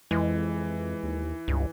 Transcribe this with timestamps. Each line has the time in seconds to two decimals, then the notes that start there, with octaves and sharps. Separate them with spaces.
0.11 F2 E3 G#3
1.03 D#2
1.48 C#2 G2